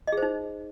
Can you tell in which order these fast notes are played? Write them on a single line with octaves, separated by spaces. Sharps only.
D#5 G#4 C5 D#4